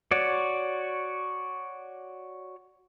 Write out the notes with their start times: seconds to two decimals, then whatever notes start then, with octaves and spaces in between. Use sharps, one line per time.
0.11 F#4 C#5 D5